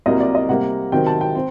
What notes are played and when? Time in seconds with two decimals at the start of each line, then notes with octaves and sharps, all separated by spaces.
0.06 C2 C3 F#3 A#3 D#5
0.20 D5
0.35 D#5
0.49 C3 G3 A#3 F#5
0.92 C3 D#3 F#3 C4 G5
1.07 A5
1.21 G5
1.35 C4